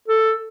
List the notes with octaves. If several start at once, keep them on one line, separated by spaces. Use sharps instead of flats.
A4